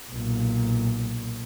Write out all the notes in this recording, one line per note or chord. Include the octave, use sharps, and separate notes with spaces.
B1 A#2